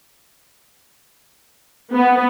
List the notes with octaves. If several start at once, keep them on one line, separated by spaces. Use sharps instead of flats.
B3